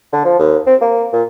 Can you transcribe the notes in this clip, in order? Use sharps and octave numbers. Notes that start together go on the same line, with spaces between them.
D3
F3
D#2
C4
A#3
A#2